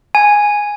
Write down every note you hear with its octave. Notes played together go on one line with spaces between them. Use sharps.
G#5